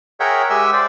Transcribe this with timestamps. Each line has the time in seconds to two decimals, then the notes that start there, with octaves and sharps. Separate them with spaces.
0.20 G#4 A#4 C#5 E5 F#5 G5
0.50 G#3 G4 E5 G#5 E6
0.73 C5 D5